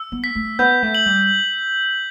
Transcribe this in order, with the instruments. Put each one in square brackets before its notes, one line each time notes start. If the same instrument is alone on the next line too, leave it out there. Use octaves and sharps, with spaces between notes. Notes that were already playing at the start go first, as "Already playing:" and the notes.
Already playing: [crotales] E6
[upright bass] B3
[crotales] B6
[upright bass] A3
[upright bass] B3 [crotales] G6
[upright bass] A3
[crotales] F#7
[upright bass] G3